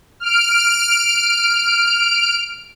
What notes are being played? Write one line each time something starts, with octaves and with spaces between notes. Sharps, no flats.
F6 D7